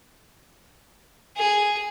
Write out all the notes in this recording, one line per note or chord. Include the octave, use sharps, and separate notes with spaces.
G#4